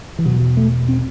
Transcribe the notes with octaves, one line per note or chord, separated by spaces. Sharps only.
E3
E2 B2 F#3
A3
C4